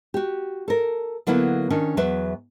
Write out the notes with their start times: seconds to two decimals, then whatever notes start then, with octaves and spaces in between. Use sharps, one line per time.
0.14 F#4 G4
0.68 A4 A#4
1.27 D3 F#3 A#3 B3 E4
1.70 D#3 C#4 D4
1.97 E2 F#3 B4 E5